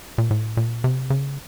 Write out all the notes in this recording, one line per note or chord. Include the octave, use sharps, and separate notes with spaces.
A#2
A2
A#2
C3
C#3